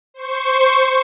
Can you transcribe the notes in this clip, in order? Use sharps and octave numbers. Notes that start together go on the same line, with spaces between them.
C5 C#6